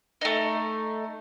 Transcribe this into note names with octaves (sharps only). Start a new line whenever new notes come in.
A3 D#4